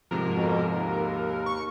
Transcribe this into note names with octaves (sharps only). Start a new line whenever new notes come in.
G#2 C3 F3 A#4
F2 B2
D#2
C#6